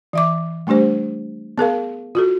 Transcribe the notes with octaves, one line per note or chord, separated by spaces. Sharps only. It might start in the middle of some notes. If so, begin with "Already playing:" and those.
E3 E5 D6
G3 A3 D4 G4 C5
B3 G#4 A#4 F5
F4 F#4 A4